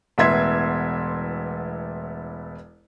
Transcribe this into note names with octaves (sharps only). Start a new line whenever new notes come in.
E1 A1 B3 E5 C6 G#6